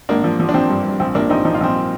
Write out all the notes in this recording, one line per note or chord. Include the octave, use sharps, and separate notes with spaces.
G#1 A#3 D4
F3
F3
D4
F3 C4
G2
G2
A#1 C4
A#1 A#3 D4
A#1 C4 D#4
F3 D#4
F4
A#1 C4 D#4